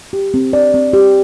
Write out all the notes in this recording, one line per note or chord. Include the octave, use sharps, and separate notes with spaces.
G4
C4
D5
C4
G4